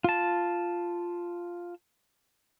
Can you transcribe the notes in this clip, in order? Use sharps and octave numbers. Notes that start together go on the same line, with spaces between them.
F4 A5